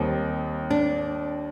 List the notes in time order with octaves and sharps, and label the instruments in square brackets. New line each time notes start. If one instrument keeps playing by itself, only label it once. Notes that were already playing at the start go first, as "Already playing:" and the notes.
Already playing: [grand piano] D#2 D#3 G3 C4 [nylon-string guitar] D#4
[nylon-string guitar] D4